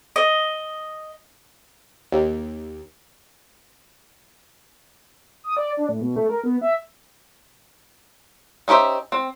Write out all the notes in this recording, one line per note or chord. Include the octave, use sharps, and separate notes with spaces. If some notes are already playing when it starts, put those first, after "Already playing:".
D#5
D#2
D#6
D5
D4
A2
B2
A3
A#4
B3
E5
C#4 D#4 G4 C5 E5
C4